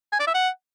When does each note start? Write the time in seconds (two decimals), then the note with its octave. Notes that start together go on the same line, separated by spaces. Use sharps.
0.12 G#5
0.20 D5
0.27 E5
0.34 F#5